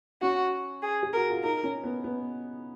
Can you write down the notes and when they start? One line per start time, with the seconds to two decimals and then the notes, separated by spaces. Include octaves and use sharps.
0.22 C#4 F#4
0.83 G#4
1.03 G#4
1.13 F#4 A#4
1.30 F4
1.44 D#4 A#4
1.63 C#4
1.84 B3
2.04 B3